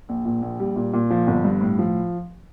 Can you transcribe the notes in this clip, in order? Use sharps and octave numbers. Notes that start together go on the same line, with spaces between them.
A#1
A#2
A#1
G3
A#2
A#2
F3
G1
G2
A2
F3